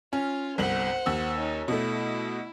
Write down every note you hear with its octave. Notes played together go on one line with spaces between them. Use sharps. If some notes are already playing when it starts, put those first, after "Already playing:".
C#4 F4
G1 C2 C5 F#5 F#7
D#2 E6
C#4 D#4
B2 A3 E4